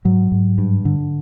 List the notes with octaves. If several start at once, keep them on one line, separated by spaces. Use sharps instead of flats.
G#2 F#3
G#2
G2
D3